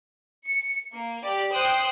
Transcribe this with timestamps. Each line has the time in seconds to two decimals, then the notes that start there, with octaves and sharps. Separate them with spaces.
0.48 C#7
0.92 A#3
1.22 G4 D5
1.51 C5 G5 D#6 F#6